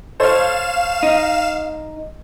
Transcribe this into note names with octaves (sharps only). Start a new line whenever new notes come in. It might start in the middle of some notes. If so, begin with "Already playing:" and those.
A4 C5 C#5 F5 E7
D#4